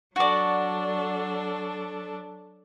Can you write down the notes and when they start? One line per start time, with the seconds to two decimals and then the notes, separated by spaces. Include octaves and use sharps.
0.16 F#3 D4 F#4 A4 D5